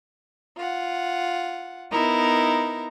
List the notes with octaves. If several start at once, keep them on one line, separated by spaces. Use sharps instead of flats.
F4 F#5
B3 D#4 E4 A#4 A#5